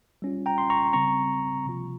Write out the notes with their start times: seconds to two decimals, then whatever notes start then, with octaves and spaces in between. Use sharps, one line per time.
0.22 G3 C#4 F4
0.46 G5 A#5
0.58 C6
0.70 A#5 C#6
0.93 C#3 G3 C4 A#5 C#6
1.66 C3 F3 A#3 F4